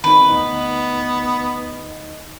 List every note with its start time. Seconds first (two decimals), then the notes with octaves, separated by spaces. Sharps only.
0.04 D#3 C4 D#4 B4
0.29 D2 B3 D#4 D#5